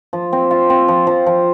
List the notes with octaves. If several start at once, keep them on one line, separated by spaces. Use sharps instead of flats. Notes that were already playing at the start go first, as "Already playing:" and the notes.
F3
C4
F4
C4
F3
F3
F3